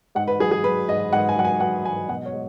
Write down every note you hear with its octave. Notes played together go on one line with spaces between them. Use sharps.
G#2 F#5
B4
F#3 G#4
G#4
F#3 B4
G#2 D#5
G#2 F#5
G#5
F#3 F#5
G#5
F#3 F#5
G#2 G#5
B2 F#5
C#5
G#3